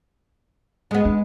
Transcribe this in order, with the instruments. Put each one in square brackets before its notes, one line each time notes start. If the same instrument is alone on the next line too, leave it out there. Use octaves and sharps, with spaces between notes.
[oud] G#3 B3
[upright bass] D4